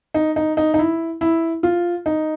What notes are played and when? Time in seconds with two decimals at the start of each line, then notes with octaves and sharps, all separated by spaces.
0.14 D#4
0.36 D#4
0.57 D#4
0.74 D#4
0.79 E4
1.21 E4
1.63 F4
2.06 D#4